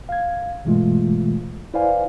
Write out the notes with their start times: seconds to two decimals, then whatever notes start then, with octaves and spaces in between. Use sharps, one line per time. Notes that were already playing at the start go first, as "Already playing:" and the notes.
0.09 F5 G#6
0.64 G2 B2 E3 G#3 A3 F4
1.74 E4 B4 C5 D5 F5 G#5